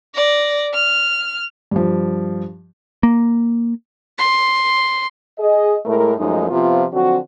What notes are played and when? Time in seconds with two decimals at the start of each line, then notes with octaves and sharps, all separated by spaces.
0.15 D5 A#6
0.74 F6
1.71 G2 F3
3.03 A#3
4.18 C6
5.39 G#4 D#5
5.86 A2 G#3 A3 E4 A#4
6.18 F#2 F3 G#3 A3 D#4
6.49 C3 F3 B3 F4
6.92 D3 F3 F#3 C4 F#4